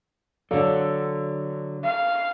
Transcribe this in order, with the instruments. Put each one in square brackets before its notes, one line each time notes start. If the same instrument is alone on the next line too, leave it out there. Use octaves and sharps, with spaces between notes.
[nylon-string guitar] D3 F#3 [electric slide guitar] A4 D5 F5
[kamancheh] F5